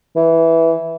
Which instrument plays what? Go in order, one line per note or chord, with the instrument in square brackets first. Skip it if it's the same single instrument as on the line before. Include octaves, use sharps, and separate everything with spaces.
[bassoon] E3